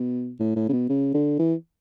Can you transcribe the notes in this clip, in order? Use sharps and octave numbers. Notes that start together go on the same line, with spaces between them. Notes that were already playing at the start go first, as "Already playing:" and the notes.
Already playing: B2
A2
A2
C#3
B2
C#3
D3
E3